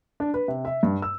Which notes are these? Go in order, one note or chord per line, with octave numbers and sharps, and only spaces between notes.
D4
B4
C3
E5
G2
E6